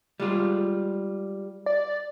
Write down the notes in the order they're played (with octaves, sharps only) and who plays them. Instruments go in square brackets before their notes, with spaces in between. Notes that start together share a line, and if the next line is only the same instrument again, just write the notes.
[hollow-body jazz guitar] G3 G#3 F4
[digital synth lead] D5